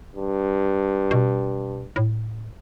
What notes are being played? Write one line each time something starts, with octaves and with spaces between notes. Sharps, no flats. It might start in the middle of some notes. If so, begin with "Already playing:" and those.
G2
B2
A2